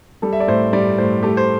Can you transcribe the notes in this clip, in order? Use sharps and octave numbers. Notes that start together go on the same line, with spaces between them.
G3 A4
E5
D5
A2 C5
G3 D5
A2 C5
A3 G4
C5